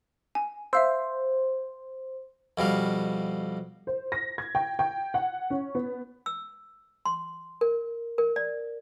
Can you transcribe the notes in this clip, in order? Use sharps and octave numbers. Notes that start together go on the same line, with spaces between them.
G#5
C5 E5 F5 E6
F2 B2 G3 F5
C5
A#6
G#6
G5
G5
F#5
C#4
B3
E6
C6
A#4
A#4
D5